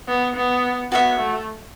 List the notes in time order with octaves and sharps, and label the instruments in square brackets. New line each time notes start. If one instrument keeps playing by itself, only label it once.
[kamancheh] B3
B3
[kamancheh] B3 [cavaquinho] F#4 C#5 E5
[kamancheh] A3